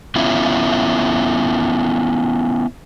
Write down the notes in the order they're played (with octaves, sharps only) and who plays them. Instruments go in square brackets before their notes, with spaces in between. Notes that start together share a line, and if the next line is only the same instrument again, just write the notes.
[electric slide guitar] B3 C#4 E4 F4